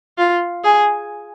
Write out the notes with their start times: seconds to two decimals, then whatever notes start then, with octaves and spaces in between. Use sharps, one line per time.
0.18 F4
0.64 G#4